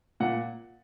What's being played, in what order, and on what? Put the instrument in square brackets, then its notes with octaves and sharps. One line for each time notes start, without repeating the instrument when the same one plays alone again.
[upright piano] A#2 F#5